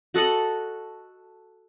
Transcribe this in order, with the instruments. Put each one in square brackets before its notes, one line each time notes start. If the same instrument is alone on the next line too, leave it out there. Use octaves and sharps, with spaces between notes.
[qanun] F#4 A4 D#5 F#5